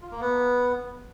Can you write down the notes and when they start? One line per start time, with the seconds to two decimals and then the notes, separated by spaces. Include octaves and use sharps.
0.02 F4
0.11 A#3
0.21 B3